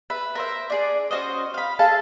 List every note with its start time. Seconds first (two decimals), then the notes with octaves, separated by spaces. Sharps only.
0.10 B4 E5
0.35 A#4 C5 E5
0.70 D4 G#4 D5
1.11 C#4 F#4 C5 D#5
1.54 F5 B5
1.79 G#4 A4 F5 A5